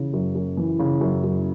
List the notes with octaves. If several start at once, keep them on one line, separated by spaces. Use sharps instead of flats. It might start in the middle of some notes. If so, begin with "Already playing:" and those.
Already playing: C#3 E3
F#2
F#2
E3
C#3
F#2
F#2